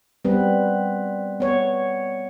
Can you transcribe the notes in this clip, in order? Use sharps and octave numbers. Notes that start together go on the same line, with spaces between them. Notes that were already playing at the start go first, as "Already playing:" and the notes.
G3 B3 C4 B4
B3 C#5